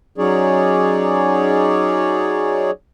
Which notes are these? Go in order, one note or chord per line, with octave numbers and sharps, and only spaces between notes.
F#3 C#4 D#4 G#4 C#5 D5